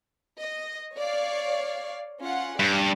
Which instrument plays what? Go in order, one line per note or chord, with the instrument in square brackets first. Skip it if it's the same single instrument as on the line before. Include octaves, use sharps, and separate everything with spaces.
[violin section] D#5
C#5 D5 F5
C#4 F4 F#5
[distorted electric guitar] G2 [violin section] D5 D6